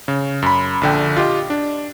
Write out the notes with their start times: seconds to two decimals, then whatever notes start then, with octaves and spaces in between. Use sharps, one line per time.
0.08 C#3
0.42 F#2 B5
0.81 A#1 D3 G5
1.17 F4 G4 D#5
1.50 D4